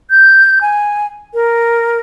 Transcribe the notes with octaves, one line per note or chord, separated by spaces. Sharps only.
G6
G#5
A#4